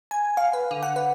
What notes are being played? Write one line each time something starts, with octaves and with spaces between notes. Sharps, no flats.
G#5
F5
B4
D3
F#5
B4